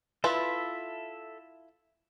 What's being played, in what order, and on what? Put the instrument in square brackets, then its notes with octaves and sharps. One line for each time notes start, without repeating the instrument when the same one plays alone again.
[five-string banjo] E4 F4 B4 [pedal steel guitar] A4 E5